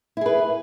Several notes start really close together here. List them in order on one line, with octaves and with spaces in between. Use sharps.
E4 G#4 B4